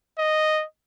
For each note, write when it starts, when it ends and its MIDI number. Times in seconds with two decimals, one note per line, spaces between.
0.19 0.64 75